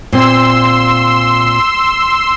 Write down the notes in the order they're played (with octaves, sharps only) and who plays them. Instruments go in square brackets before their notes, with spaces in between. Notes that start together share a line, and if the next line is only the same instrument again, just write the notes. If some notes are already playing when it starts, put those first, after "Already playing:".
[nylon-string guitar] A#2 C4 [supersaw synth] C6 E6